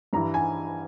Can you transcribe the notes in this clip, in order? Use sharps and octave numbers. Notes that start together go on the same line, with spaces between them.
G2 E3 A#5
G#5